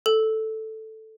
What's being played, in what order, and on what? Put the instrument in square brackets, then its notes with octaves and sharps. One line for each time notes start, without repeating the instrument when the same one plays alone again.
[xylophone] A4